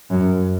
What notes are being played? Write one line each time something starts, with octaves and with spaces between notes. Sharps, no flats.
F#2